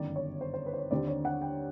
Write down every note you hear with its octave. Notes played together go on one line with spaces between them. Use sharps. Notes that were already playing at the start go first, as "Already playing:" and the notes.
Already playing: G1 F#2 D#3 D5
C#5
C5
C5
B4
C5
C#5
D#2 D3 G3 C4 D5
C#5
F#5
G5